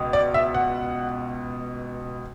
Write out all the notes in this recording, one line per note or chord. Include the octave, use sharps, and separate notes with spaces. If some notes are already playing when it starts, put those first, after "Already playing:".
Already playing: C#2 B2
D5
E5
F#5